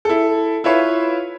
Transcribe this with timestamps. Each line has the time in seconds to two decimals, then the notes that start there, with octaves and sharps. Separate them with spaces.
0.05 E4 A4
0.64 E4 F4 B4 C#5 E5 F5